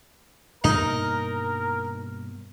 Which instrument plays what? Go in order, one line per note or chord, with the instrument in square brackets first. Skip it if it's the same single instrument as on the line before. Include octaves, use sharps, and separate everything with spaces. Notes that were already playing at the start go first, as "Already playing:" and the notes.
[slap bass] G2 B2 A#3 [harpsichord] D#4 [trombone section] A#4